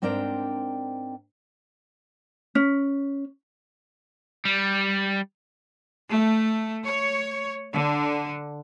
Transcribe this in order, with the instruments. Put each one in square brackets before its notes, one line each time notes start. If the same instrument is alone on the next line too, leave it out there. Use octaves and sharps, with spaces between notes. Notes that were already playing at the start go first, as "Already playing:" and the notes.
[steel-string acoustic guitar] G#2 C4 D4 A#4 G5
[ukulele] C#4
[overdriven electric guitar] G3
[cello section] A3
C#5
D3